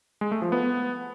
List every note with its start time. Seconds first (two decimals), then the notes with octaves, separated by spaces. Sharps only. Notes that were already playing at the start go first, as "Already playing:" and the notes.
0.21 G#3
0.31 A3
0.42 F3
0.52 B3